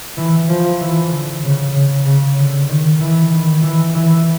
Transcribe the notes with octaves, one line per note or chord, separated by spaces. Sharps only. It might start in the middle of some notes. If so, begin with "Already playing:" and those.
E3
F3
E3
D3
C#3
C#3
C#3
D3
D#3
E3
D#3
E3
E3